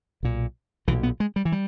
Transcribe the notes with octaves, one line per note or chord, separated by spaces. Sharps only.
B1 A#2
B1 A#2 E3
B3
G#3
G3
E3
G3